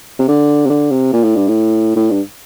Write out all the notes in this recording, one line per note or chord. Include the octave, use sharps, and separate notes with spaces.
C3
D3
C3
D3
C3
A#2
A2
G2
A2
A2
G2